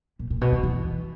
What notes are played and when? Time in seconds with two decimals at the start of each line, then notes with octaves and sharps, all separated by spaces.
0.19 A#2
0.30 A#2
0.41 B2
0.52 D#3
0.63 E3